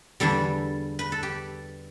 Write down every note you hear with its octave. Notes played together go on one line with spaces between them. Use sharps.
E2 D3 G3 A4
B4
A4
G4